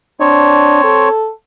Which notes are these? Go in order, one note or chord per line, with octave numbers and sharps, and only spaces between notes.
C4 D4 C#5
A4